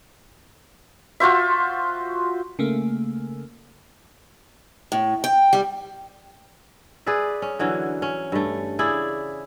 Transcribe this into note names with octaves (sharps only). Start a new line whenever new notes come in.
F4 F#4 C5 E5
C#3 A3 A#3
A2
G5
G3
G#4 B4 D5 E5
C#4
D3 E3 F#3 C#4
C#4
G2 A3
C#3 E4 G#4 D5